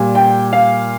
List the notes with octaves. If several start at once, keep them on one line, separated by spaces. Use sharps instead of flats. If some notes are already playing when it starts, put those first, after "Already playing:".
Already playing: A#2 G3
G5
F5